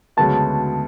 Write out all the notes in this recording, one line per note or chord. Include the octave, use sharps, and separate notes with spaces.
D2 C#3 G#3 B3 F#4 A5